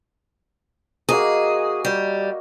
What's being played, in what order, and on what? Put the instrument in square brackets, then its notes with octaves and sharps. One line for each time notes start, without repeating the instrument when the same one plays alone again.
[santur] A#3 F#4 D#5 [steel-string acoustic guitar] G#4
[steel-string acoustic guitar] G3